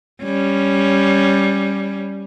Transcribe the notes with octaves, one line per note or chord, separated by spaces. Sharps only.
G3 C#4